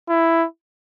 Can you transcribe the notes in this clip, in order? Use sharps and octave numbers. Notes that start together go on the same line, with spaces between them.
E4